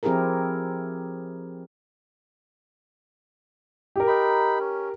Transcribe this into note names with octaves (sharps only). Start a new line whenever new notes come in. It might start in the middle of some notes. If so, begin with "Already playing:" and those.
F3 C4 E4 G4 G#4 A#4
G4 A#4
D#4 B5
C#4